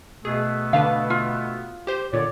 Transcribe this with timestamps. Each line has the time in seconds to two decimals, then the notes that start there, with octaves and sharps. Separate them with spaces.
0.25 B2 A3 B3 G#4
0.73 D3 D4 B4 F5
1.10 F4
1.87 G4 C5 C6
2.13 A#2 D3 C#5 D5